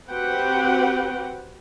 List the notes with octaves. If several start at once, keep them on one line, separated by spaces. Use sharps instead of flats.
C4 F#4 G4 B4 F#5 G5